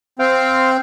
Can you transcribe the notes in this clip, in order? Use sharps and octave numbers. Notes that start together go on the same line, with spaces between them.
C4 C5 F5 G5